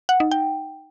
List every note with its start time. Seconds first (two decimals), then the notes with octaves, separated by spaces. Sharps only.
0.09 F#5
0.20 D#4
0.31 G5